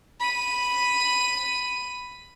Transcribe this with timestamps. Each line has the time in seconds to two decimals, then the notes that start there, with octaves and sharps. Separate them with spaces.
0.20 B5 D#7